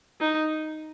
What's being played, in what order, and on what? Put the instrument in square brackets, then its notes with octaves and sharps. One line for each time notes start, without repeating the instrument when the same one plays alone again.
[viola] D#4